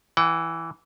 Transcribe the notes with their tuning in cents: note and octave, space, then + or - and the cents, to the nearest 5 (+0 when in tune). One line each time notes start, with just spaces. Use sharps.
E3 +0 F#5 +45